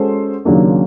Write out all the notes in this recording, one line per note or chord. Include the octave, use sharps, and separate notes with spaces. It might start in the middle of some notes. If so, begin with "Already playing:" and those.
Already playing: G#3 C#4 F#4 A4 C5
D#2 C#3 F#3 A#3 D4